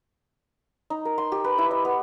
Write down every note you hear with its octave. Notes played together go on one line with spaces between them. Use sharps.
D#4
A#4
C6
G4
B4
E4
D#5
B3